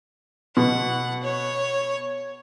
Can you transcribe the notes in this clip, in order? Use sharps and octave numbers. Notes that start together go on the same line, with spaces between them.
B2 F#5
C#5